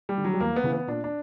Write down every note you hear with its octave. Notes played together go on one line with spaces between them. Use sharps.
G3
D3
F#3
G3
E2 A#3
B3
C#3 E3
B3
A#2 D4
D4